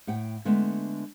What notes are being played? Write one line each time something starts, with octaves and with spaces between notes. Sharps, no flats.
A2 F#5 G5
D3 G#3 A3 B3